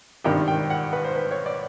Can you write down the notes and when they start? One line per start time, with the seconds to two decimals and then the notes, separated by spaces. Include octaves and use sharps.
0.24 G#1 G2 D#3 G3 G5
0.48 G5
0.70 F#5
0.93 B4
1.04 C5
1.16 B4
1.31 C#5
1.46 D5